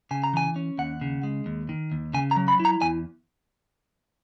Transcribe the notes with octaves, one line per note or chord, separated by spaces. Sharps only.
C#3 G#5
A#5
E3 G#5
C#4
D#2 F#5
C#3
G#3
D#2
D#3
D#2
C#3 G#5
A#5
F#3
B5
E4
A#5
E2 G#5